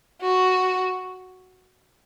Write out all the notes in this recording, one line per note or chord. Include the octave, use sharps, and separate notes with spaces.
F#4